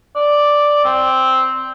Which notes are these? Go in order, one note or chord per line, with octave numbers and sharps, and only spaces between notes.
D5
C4